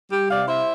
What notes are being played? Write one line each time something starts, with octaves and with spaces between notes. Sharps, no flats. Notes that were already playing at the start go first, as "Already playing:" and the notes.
G3 G4
C3 D5 F5
E4 C5 E5